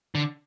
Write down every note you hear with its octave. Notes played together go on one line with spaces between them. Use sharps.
D3